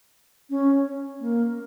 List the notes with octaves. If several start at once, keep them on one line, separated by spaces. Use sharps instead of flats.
C#4
A#3